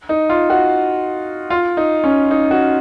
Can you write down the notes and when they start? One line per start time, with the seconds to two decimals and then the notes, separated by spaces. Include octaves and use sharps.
0.09 D#4
0.29 F4
0.50 F#4
1.50 F4
1.77 D#4
2.04 C#4
2.31 D#4
2.51 F#4